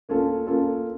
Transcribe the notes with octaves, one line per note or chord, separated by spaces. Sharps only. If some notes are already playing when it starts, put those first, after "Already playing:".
A#3 C#4 F4 A4
A#3 C#4 F4 A4